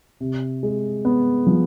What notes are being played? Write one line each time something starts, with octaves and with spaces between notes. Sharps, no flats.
C3
G#3
B3
F3